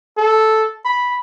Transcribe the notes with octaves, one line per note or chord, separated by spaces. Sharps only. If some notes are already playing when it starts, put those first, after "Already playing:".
A4
B5